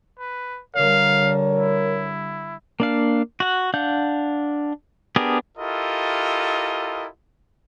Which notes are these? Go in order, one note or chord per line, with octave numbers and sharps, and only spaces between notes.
B4
D3 G3 A#4 C#5 F5
E4
A#3 D4 F5
F#4 F#5
D4 F5 F#5 G6
B3 D4 G4 G#4 A#4
E4 F4 G4 A4 A#4 D#5